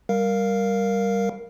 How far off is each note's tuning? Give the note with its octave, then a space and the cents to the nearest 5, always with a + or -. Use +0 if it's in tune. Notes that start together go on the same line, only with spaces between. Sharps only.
G3 +0 A#4 +0 F5 +0